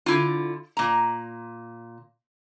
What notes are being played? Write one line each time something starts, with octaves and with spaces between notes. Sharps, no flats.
D3 E4 F4
A#2 A#5